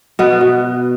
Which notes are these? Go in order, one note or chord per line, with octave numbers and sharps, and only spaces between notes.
B2 B3
B2